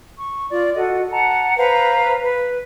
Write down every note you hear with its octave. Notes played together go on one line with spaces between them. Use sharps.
C#6
F4 D5
F#4 A4 D#5 F#5
F#5 A5 A#5
B4 C5 F5 A#5
B4